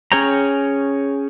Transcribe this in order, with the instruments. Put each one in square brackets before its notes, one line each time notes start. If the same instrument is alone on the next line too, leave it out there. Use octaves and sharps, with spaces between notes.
[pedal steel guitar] C#4 G#4 C#5 G5 A#5